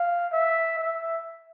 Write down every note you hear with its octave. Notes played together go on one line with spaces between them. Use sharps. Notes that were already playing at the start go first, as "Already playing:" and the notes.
Already playing: F5
E5
E5